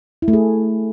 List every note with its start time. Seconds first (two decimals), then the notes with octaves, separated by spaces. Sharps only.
0.22 E4
0.28 A3
0.33 G#4